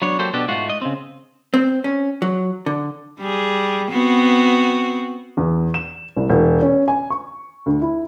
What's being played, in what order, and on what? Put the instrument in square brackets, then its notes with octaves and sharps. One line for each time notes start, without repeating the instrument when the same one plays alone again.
[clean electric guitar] F#3 B3 D4 C#5
F#3 A#3 G4 A4 C5
B2 B3 D4 G4 A4
G#2 A3 F4 F#4
D#5
C#3 C4
[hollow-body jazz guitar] C4
C#4
F#3
D3
[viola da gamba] G3 G#4
B3 C4 F#4
[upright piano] E2
E7
C2
E1
C#4
G#5
C#6
D2
E4